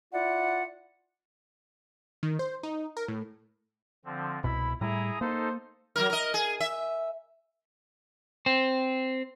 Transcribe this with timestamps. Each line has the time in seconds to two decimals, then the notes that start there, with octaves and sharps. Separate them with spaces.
0.13 E4 F4 D5 F#5
2.23 D#3
2.39 C5
2.63 D#4
2.97 A#4
3.08 A2
4.05 D3 F3 C4
4.44 C2 B2 E4 B5
4.81 A2 G3 E4 G#4 A#5 D#6
5.21 A#3 D#4 A4 C5
5.96 F#3 G3 A#4
6.10 A#4 D#5
6.34 G#4
6.60 E5
8.46 C4